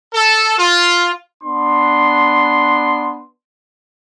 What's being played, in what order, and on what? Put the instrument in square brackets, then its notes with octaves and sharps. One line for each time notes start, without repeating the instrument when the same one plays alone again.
[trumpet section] A4
F4
B3 D4 C6